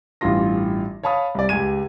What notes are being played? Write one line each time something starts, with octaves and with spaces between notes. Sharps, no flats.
A1 G2 E3 F4 C6 A#6
C#5 F5 A5 B5 D#6
C2 D5
C#2 G4 G#5 G#6 D#7